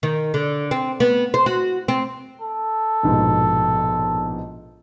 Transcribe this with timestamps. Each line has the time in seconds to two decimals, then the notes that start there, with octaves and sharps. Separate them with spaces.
0.03 D#3
0.34 D3
0.71 C4
1.00 B3
1.34 C5
1.46 F#4
1.88 C4
2.42 A4
3.03 A#1 G#2 B2